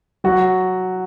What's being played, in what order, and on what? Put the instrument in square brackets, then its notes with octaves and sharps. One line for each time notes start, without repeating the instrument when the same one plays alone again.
[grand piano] F#3 F#4